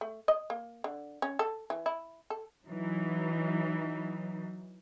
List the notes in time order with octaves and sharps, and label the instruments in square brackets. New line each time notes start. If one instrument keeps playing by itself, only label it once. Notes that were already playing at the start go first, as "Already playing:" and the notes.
[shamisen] A3
D#5
A#3
D3
C#4
A4
E3
E4
A4
[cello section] E3 F#3 D#4